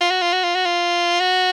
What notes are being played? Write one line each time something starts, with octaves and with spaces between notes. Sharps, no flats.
F4
F#4
F4
F#4
F4
F#4
F4
F#4